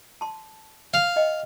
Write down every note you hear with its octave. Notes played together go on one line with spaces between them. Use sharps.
A5 C6
F5
D#5 G5